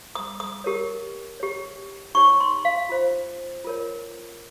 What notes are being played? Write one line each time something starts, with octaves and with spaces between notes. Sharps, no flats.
D#6
D#6
G4 A#4 C#5
G4 C#5
D#4 G4 C#5 C#6
C6
F5
F4 C5
F4 A#4 C#5